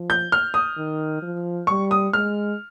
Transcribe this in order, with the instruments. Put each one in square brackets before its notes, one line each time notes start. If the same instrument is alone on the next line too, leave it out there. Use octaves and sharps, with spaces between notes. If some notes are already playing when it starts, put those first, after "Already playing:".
Already playing: [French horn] F3
[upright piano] G6
F6
D#6
[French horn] D#3
F3
[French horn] G3 [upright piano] C#6
[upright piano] D#6
[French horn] G#3 [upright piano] F6